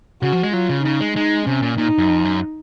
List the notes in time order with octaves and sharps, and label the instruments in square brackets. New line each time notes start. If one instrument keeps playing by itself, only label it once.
[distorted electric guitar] C#3 [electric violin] F#4
[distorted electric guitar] F3
G#3
[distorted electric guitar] F#3 [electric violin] F4
[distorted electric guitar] C#3
[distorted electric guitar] C#3 [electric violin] D#4
[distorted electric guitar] G#3
[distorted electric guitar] G#3 [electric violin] D#4
[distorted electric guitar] C3 [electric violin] C#4
[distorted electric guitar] A#2
[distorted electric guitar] A#2 [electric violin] D#4
[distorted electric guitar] F#2
F2
F#2